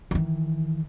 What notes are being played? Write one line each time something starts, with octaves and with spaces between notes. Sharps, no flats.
D#3 E3